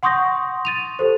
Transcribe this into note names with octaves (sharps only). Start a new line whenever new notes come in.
F#5 C6 C#6 D#6 G6 A#6
A6 D#7 F7
G4 A4 C5